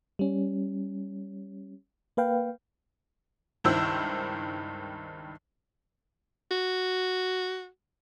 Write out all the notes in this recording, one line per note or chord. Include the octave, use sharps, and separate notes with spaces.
G3 C#4
A#3 B4 F5 G5
C#2 G2 D#3 E4 C5 E6
F#4